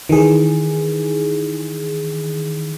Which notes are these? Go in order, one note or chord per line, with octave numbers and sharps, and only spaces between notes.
D#3 E3 G#4